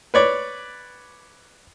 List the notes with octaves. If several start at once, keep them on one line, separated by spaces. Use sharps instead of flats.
B4 C#5 D5